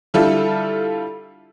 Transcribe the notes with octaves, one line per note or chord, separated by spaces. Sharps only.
D3 G3 E4 F4 A4